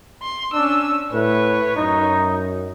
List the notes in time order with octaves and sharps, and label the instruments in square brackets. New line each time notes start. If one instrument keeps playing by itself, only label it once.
[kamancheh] C6
[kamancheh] C#4 E6 [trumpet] D4
[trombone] A2 [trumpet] B4 [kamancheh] C#5
[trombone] F#2 [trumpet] D#4